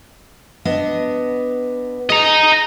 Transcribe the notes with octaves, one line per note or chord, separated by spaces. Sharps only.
B3 D4 D#5
G#4 D#5 A#5